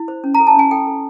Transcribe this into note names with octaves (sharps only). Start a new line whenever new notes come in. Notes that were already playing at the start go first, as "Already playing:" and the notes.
Already playing: E4
C5
C#4
A#5
A4
A5
C#4 G#5
A4 G5
A4